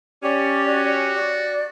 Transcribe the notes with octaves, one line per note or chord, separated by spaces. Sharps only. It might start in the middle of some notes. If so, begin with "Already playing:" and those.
C#4 G4 D5
F#4
D5